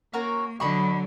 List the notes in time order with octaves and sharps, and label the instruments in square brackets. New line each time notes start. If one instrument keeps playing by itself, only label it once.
[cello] A#3 [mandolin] C#4 F#4 A#4
[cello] D3 F#3 [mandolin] D#5 B5 C#6